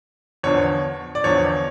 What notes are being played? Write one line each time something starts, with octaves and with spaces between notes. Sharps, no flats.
E2 D3 F3 C#5
D5
E2 D3 F3 C#5